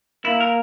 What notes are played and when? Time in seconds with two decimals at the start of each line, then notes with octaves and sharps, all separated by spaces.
0.25 A#3 E4
0.40 A#4